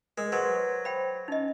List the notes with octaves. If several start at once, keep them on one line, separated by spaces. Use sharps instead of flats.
G#3 A#4
F#3 B4 C5 C6
G5 B5
C#4 D#4 D#5